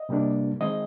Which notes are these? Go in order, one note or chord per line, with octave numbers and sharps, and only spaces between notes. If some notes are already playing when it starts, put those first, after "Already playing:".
Already playing: D#5
C3 G3 A#3 D4
D#3 G#3 C4 D#5